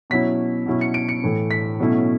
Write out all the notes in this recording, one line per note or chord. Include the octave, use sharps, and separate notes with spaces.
B2 F#3 C#4 E4 B6
B2 F#3 C#4 E4
C#7
D7
C#7
A2 E3 A3
B6
B2 F#3 A3 C#4 E4